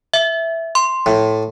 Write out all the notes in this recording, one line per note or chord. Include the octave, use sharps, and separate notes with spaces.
E5
C6
A2